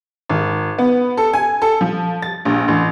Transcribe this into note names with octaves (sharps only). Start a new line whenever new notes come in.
G#1
B3
A4
G#5
A4
F3
A6
A#1
A1